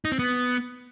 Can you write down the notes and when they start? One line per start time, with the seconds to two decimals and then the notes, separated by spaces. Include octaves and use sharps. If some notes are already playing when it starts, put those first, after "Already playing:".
0.05 D#4
0.12 C4
0.19 B3